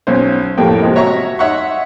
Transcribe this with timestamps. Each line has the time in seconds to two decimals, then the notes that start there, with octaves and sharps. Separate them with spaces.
0.07 B1 C#4 C5
0.58 F2 A2 G3 A#3 G5
0.83 C3 F3 G#3
0.95 F#4 C#5 E5 A#5 C#6
1.39 D#4 C#5 E5 F#5 C6 C#6